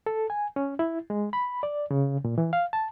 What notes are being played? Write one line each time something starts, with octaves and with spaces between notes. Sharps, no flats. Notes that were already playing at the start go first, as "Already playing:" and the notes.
A4
G#5
C#4
E4
G#3
B5
D5
C#3
A#2
E3
F5
A5